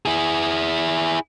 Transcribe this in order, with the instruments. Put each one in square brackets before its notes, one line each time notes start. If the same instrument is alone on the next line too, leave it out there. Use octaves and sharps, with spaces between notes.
[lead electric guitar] E4 G#4